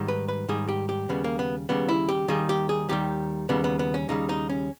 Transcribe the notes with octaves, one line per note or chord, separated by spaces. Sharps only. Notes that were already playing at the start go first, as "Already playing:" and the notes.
Already playing: G#2 D#3 G3
B4
B4
G#2 D#3 G3 G#4
G4
G4
D#2 C#3 G3 B3
A#3
B3
D#2 C#3 G3 B3
E4
G4
D#2 D#3 G3 G#4
G4
G#4
D#2 D#3 G3 G4
D#2 C#3 G3 B3
B3
B3
C#4
D#2 C#3 G3 D#4
D#4
C#4